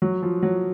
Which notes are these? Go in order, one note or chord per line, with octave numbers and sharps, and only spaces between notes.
F#3
F3
F#3